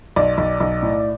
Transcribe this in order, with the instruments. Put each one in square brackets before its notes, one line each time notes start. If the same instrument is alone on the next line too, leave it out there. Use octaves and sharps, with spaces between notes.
[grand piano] B1 D5
B1
B1
A2